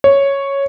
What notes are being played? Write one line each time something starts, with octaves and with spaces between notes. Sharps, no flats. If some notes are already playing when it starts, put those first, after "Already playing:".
C#5